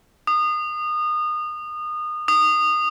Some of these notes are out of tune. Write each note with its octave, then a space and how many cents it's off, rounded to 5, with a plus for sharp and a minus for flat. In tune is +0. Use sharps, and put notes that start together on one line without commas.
D#6 -30
D#6 -25